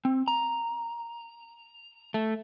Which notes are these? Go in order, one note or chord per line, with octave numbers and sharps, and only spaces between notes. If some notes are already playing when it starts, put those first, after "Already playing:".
C4
A#5
A3